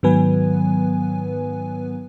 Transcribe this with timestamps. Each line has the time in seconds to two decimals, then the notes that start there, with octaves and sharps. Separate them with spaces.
0.03 G#2 D#3 F#3 B3 B4 G#5